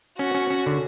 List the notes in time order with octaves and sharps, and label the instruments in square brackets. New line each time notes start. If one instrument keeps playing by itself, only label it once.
[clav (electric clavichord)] C#4 [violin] F#4
[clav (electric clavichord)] C#4
C#4
D3